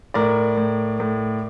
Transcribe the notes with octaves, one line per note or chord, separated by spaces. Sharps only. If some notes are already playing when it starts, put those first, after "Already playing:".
A2 A#4 D5
A2
A2